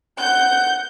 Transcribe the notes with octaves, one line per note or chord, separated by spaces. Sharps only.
F#5 G6